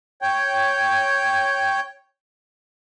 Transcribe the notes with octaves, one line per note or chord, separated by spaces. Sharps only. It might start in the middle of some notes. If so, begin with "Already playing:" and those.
C#5 G5